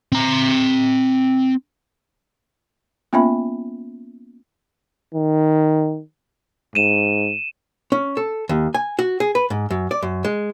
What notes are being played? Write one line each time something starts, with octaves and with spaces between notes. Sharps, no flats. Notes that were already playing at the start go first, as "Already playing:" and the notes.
C4 A#5
A#3 B3 C#4 F4 E5 B5
D#3
G#2 D#7 E7
C#4
A4
D#2
G#5
F#4
G#4
B4
G#2
F#2
D5
F#2
G#3